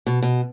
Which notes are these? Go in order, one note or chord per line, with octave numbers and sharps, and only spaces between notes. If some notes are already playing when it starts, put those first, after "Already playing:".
B2
B2